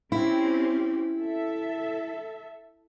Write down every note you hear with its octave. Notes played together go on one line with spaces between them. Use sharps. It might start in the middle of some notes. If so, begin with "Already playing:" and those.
C4 C#4 E4 G4
A4 E5